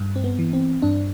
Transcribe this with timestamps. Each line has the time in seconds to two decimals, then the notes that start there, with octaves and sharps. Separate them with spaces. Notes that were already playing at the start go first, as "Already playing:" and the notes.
Already playing: G2
0.16 C4
0.24 B3
0.39 E3
0.53 C4
0.82 G2 D4